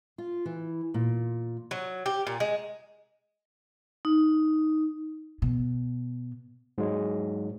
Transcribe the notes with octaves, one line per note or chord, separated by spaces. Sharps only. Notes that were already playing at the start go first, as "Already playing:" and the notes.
F4
E3
A#2
F#3
G4
A#2
G#3
D#4
B2
G#2 F#3 G#3